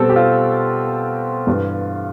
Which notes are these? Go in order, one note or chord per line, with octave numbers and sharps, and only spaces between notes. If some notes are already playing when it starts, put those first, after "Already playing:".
Already playing: B2 G3 C4 A4
G4
F4
G2 E3 G3 D4